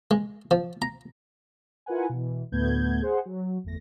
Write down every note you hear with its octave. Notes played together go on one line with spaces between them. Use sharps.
G#3
F3
A#5
E4 F4 A#4 B4 F#5 G#5
B2 E3
D2 A2 A3 B3 G6 G#6
G#4 C5 F#5
F#3
G1 E2 A3 A#6